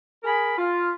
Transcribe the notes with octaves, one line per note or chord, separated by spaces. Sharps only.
G#4 A#4 B5
F4